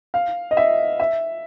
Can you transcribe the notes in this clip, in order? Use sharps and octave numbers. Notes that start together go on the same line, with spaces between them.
F5
D#5
E5
E5